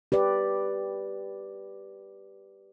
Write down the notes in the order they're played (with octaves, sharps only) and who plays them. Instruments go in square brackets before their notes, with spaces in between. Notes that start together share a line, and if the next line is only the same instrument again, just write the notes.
[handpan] G4 B4 D5